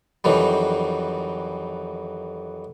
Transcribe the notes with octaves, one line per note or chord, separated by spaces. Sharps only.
F2 D#3 E3 F#3 G3